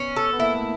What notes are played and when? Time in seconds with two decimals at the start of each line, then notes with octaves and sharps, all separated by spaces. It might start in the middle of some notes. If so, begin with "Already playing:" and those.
Already playing: B3 C#4
0.16 A4
0.33 B3
0.39 A#3 E4
0.54 A3